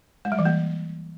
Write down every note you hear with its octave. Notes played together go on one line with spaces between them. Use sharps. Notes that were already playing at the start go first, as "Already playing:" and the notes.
G#3
G3
E3
A#3